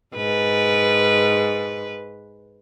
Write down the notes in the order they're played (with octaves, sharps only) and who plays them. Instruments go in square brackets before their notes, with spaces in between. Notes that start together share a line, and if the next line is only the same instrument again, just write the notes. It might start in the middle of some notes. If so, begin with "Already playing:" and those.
[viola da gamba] G#2 B4